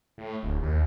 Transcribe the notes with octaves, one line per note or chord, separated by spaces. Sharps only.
A2
D1
D#2